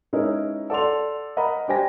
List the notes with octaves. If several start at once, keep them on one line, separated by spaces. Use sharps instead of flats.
G#3 C#4 D#4 E4 A#4 B4
A4 D5 F#5 C6 F7
A#4 D#5 F#5 A#5 B5
D4 G4 C5 G5 G#5 A#6